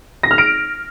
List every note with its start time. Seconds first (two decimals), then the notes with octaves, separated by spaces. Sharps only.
0.23 A#6
0.31 F6
0.38 D7